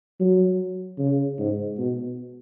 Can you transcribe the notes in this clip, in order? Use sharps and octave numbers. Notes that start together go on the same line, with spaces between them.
F#3
C#3
G#2
B2